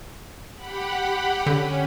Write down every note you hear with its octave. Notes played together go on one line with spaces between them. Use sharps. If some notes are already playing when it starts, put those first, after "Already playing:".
G4 F#5 B5
D3 C#4